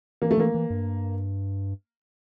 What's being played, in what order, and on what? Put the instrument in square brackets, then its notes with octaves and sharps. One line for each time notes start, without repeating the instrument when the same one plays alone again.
[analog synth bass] E3 [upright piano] A#3
[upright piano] A3
[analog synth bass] E3 [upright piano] A#3
[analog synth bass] E3
G2